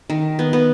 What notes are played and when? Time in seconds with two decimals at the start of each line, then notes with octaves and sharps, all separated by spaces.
0.10 D#3
0.39 B3
0.53 B3